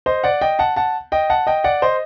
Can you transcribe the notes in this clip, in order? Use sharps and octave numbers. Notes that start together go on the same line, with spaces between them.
C5 D#5
D5 F#5
D#5 G5
F#5 A5
F#5 A5
D#5 G5
F#5 A5
D#5 G5
D5 F#5
C5 D#5